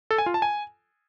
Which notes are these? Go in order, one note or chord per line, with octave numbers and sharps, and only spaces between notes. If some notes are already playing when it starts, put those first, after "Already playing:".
A4
G#5
F4
A5
G#5